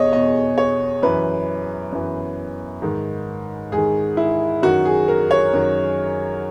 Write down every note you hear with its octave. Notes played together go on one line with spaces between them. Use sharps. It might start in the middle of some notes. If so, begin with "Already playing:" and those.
Already playing: E2 B2 G#4 C#5 D#5
E2 B2 D#5
C#5
F#2 E3 B4
F#2 E3
G#2 D#3
G#2 G#4
D#3
E4
F#2 D#3 F#4
G#4
A#4
C#5
F#2 D#3